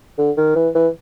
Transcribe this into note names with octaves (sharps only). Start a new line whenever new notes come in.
D3
D#3
E3
E3